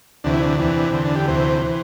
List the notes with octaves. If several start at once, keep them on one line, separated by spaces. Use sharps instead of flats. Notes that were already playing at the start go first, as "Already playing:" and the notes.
D2 C3 E3 D4
E4
D4
E2 C3 E3
E2 D3 C4
D4
G4
D2 C3 E3 C5
E3